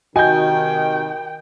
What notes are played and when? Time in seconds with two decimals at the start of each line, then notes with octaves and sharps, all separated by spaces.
0.16 C3 D#3 F#4 D#5 G5 G#5 G6